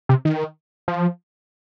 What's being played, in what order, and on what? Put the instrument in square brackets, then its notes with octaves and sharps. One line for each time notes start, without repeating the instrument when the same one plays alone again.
[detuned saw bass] C3
D#3
F3